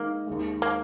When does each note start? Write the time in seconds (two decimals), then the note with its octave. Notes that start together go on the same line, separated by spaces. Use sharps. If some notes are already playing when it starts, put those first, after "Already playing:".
Already playing: D#3 G#3 A#3 D#4
0.27 D#2 D#3 G#3
0.62 A#3